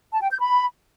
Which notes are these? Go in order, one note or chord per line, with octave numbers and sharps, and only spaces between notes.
A5
G5
G6
B5